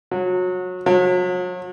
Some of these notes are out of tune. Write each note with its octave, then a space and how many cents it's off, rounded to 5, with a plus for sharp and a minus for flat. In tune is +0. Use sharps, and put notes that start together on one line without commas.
F#3 -25
F#3 -40